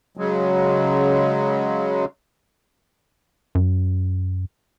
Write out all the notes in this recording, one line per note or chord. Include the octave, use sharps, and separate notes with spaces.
C#3 F#3 G#3
F#2